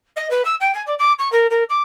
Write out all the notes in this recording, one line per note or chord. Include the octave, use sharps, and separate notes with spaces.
D#5
B4
E6
G5
G#5
D5
D6
C#6
A#4
A#4
D6